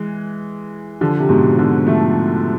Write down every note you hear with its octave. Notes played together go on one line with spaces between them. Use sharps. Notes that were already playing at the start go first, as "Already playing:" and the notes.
Already playing: E3 G#3
D3 F3
C3
G#2 B2
B2 D3
F3 A3